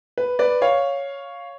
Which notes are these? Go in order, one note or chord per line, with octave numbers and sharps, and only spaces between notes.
B4
B4 D5
C#5 F5